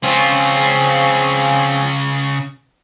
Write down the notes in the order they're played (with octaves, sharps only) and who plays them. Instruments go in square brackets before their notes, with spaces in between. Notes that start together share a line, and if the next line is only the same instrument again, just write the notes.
[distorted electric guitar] C#3 F4 [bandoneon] F3 C4 C#4